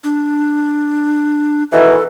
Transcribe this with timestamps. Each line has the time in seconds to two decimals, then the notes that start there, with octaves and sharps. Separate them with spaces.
0.04 D4
1.72 B2 D#3 E3 A4